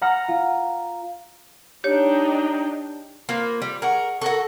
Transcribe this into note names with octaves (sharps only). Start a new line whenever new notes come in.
F#5 A#5 F6 A#6 C#7
F4
D4 D#4 G4 C#5 G5
A#3 F4 B4 C5
G3
G#4 A#4 F#5 C#6
F#4 A4 A#4 F#5 C#6